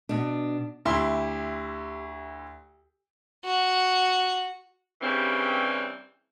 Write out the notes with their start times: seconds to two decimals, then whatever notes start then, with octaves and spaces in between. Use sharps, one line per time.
0.09 B2 D4
0.85 D2 E4 G4 C6
3.44 F#4
5.02 G2 C#3 E3 G3 A#3 C4